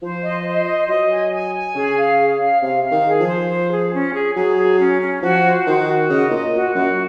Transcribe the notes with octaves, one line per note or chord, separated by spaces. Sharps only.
F3 C5
D#5
C5
D#5
F#3 D#5
G#5
G#5
G#5
C#3 G#4
F5
G#4
F5
C3 F5
F5
D#3
G#4
F3
C5
C5
G#4
C#4
G#4
F#3 G#4
G#4
C#4
C#4
F3 F#4
C5
D#3 F#4
F#4
C#3 D#5
A#2 D#5
A#2 F#4
F#2 F#4